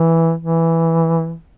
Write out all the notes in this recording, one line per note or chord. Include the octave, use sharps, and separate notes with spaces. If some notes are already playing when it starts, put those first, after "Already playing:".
Already playing: E3
E3